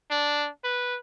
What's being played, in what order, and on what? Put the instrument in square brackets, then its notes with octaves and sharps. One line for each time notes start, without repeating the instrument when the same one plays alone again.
[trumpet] D4
B4